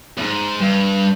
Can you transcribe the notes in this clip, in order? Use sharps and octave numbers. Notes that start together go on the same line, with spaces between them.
E2 G#2
G2